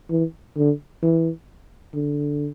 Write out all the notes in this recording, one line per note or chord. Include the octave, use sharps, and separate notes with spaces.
E3
D3
E3
D3